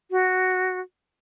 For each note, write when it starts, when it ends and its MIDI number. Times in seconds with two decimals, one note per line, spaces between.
0.11 0.81 66